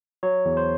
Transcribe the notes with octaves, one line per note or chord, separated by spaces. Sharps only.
F#3 C#5
E2
C5